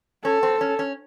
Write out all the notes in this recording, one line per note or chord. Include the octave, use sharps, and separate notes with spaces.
C#4 A4
C4
C#4
C#4